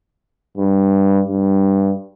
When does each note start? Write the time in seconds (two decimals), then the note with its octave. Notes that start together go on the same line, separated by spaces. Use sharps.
0.57 G2
1.28 G2